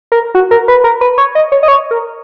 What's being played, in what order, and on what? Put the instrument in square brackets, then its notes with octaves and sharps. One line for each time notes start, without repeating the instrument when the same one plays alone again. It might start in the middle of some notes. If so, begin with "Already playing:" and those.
[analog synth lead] A#4
F#4
A#4
B4
A#4
B4
C#5
D#5
C#5
D#5
C#5
A#4